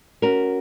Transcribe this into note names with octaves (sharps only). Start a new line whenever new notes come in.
C#4 F#4 A#4